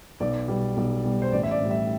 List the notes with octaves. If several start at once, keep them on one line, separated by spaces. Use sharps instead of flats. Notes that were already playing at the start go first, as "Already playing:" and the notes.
B1 D5
B2 G3
B1
B2 G3
C5
A1 D5
E5
D5
A2 G3
E5